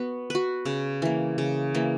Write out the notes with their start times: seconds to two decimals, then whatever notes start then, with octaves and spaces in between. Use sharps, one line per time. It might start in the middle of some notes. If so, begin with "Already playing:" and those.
Already playing: B3 F#4 B4
0.30 F#4 B4
0.65 C#3
1.02 E3 A#3
1.38 C#3
1.75 E3 A#3